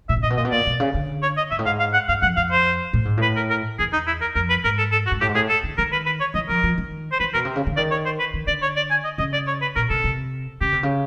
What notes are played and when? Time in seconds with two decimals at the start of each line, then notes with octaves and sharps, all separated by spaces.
0.09 A#2 E5
0.16 B2
0.23 A#2 D#5
0.30 B2
0.37 A#2 D#5
0.45 B2
0.51 A#2 D5
0.66 B2
0.80 C#3
0.94 D3
1.23 C#5
1.37 D#5
1.51 G#2 E5
1.59 A2
1.66 G#2 F5
1.80 F5
1.93 F#5
2.08 G2 F5
2.22 F2 F#5
2.37 F2 F5
2.51 C5
2.93 A2
3.05 G#2
3.17 A2 B4
3.36 A#4
3.50 A#4
3.79 E2 G#4
3.93 D#4
4.07 E4
4.21 A#4
4.35 F2 A#4
4.50 B4
4.64 G#2 A#4
4.78 A4
4.92 A4
5.07 F#4
5.11 G#2
5.21 A2 G4
5.29 G#2
5.35 A2 G#4
5.49 A4
5.63 D3
5.78 D#3 A#4
5.92 B4
6.06 B4
6.20 C#5
6.34 E3 D#5
6.49 F3 A#4
6.63 F3
6.78 D#3
7.12 C5
7.20 E3 B4
7.34 B2 A#4
7.45 C3
7.56 C#3
7.67 D3
7.77 D#3 D5
7.91 C#5
8.05 C5
8.20 B4
8.34 D#3
8.47 D3 D5
8.62 C#5
8.76 D5
8.91 G#5
9.05 D#5
9.18 C#3 D#5
9.33 D5
9.47 C#5
9.62 B4
9.76 A#2 A#4
9.90 C3 A4
10.04 C3
10.61 C#3 G4
10.72 C3
10.83 C#3